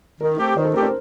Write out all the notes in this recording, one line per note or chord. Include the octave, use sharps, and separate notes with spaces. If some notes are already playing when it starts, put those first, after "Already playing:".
D#3 A#4
A3 C4 G4
D#3 C5
A4
A3 C4 G4 A#4
C5